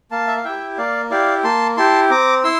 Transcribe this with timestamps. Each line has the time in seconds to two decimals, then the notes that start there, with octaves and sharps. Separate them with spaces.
0.11 A#3 F5 A5
0.27 E5
0.37 F5
0.44 E4 G4 E5 G5
0.78 A#3 D5 F5
1.11 E4 G4 D5 F5
1.44 A#3 A5 C6
1.77 E4 G4 A5 C6
2.10 C4 A#5 D6
2.44 E4 C6 E6